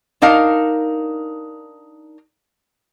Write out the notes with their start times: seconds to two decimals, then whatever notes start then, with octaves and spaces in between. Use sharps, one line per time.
0.22 D4 D#4 A#4 F5